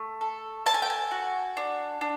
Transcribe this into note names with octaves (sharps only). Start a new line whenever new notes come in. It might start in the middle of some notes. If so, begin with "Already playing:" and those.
Already playing: A3
A4
A4 A5
G#5
G5
G#5
F#4
D4
D4